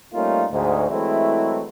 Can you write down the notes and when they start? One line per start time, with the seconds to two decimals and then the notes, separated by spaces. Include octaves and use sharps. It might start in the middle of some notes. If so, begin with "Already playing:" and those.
0.13 G3 A3 A#3 C#4 D#4 F4
0.51 D2 G#2
0.89 E3 F#3 G#3 A3 C4 E4